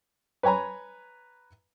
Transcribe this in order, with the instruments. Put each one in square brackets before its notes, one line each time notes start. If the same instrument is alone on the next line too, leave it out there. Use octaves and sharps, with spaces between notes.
[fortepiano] B4 C#5 G#5 A#5 B5